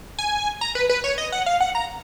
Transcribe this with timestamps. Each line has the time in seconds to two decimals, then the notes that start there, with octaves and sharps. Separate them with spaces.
0.19 G#5
0.61 A#5
0.75 B4
0.89 B4
1.04 C#5
1.18 D#5
1.32 F#5
1.46 F5
1.61 F#5
1.75 A#5